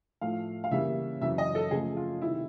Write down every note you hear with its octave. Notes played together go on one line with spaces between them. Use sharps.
A2 F3 A3 F5
F5
C#3 E3 G3 A#3 C#4 E5
F#2 C#3 E3 E5
D#5
A4
C#3 F3 A3 G#4
F4
C3 D#3 G3 E4